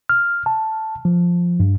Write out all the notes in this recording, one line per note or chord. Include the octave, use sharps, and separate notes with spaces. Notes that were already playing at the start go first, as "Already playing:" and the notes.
F6
A5
F3
G2